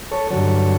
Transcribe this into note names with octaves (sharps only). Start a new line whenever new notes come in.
A4 C#5
G2 D3 F#3 A4 C#5